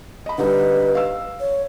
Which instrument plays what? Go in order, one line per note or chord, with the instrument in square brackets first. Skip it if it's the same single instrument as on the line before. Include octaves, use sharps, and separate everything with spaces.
[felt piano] D#5 B5
[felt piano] D3 G3 D#4 [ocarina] B4
[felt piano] F5 E6
[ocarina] C#5